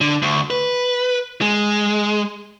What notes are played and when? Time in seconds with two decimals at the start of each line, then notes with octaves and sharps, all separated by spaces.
0.01 D3
0.22 D2
0.50 B4
1.41 G#3